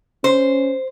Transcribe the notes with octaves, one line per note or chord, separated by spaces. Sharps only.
C#4 C5